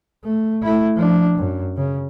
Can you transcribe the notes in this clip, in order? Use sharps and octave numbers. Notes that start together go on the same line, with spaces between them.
A3
A3 E4
F3 D4
F#2
C#3